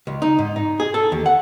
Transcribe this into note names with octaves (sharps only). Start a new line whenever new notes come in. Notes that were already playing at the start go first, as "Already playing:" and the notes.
C#2
D#4
G#2
D#4
G#4
A4
D#2
F#5